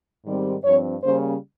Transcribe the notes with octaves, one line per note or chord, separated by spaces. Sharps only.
G#2 D#3 G3 C4
G2 F3 C4 C#5
C#3 G3 A#3 C#4 C5